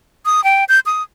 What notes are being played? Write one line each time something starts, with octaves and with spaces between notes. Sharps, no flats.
D#6
G5
G6
D#6